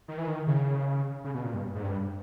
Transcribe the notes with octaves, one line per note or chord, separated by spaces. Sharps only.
D#3
E3
D#3
C#3
C#3
B2
A#2
G2
G#2
G2